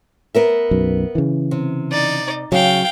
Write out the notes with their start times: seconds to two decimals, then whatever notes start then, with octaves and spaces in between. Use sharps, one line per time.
0.35 B3 A#4 E5
0.71 B1 F#2
1.15 C#3 E3
1.51 C3
1.91 D#4 D5
2.52 C#3 F#3 F5 G5